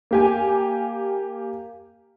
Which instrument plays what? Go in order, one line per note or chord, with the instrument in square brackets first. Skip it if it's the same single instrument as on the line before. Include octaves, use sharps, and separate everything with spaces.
[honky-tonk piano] A#3 G4 G#5